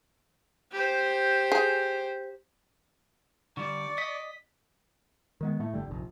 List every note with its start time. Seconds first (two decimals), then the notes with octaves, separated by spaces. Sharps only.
0.72 G4 C5
1.52 G#4
3.57 D3 G3 D5 C#6
3.98 D#5 B6
5.41 D#3 G#3 B3
5.60 A2 A3
5.74 G1 D3 G3
5.88 F1 A#1